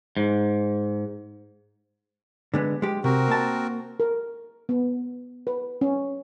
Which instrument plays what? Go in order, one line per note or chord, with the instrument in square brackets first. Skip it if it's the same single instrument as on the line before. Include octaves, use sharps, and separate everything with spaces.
[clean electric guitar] G#2
[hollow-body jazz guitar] D3 G#3 B3
G#3 G4
[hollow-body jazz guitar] C3 [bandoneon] C4 F#4 A#4
[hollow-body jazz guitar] A#3 A5
[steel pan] A#4
B3
B4
C#4